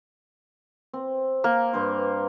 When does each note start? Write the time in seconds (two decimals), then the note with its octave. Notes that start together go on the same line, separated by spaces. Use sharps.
0.94 C4
1.44 A#3
1.73 G2 C5